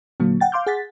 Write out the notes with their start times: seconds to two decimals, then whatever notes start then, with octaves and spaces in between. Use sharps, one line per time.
0.20 A#2 D3 F#3 A#3
0.40 F#5 G5 A6
0.52 F5 C6 D6 F6 G6
0.67 G#4 F#5 A6 B6